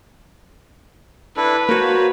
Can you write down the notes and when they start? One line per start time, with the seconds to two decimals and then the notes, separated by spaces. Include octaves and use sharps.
1.37 D4 E4 A4 B4
1.69 A#3 F#4 A#4 C5 C#5